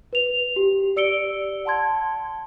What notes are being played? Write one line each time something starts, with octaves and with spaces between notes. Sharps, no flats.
B4 F7
G4
D5 E6 C#7 D7 G7
F#5 A5 C6 G#6